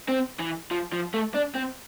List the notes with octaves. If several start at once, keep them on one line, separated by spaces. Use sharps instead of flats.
C4
E3
F3
F3
A3
D4
C4